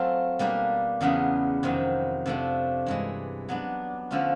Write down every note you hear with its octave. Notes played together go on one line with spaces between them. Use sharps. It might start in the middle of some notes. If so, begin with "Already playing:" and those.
Already playing: F#3 A3 C4 F4
B2 G3 A#3 D4 G4
E2 C#3 F#3 B3 D4
F2 C3 D#3 F#3
C3 F3 A3 D4
G2 E3 G#3
F#3 B3 D4
D3 F3 A3 C#4 F4